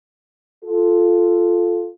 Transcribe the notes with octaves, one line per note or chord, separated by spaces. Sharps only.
F4 A4